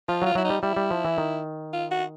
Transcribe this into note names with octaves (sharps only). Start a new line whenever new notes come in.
F3 F4
F#3 F4
F#3 E4
G3 D#4
G3 E4
G3
F3
E3
D#3
F4
F#4